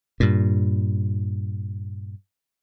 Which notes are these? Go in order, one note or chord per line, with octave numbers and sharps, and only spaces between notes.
G2 A#2